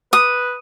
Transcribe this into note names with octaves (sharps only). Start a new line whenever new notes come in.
B4 D#6